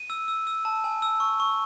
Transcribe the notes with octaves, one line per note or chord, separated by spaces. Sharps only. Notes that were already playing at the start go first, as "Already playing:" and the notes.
Already playing: D#7
E6
E6
E6
A5
G#5
E6
C#6
C#6